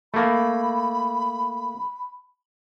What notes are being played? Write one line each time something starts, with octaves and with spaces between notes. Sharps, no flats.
A3 A#3 B5